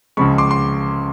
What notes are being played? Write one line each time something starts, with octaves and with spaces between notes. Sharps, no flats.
C#2 C#3 F3 G#3 B5 C#6
C6 D6
C6